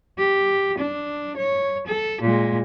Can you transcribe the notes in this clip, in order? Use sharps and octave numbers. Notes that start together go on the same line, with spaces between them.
G4
D4
C#5
A4
A#2 G#3